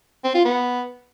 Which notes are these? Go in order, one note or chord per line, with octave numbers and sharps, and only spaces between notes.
C4
F4
B3